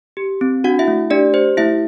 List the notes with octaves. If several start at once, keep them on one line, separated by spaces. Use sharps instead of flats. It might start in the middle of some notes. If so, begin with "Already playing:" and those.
G4
C4
D4 F#4 F#5
E4 E5
A3
D4 G4 D5
G4 C5
A3 E4 E5